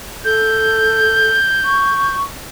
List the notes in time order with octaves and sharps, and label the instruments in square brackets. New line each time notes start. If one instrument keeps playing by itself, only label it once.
[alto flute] A4 [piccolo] G6
[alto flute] C#6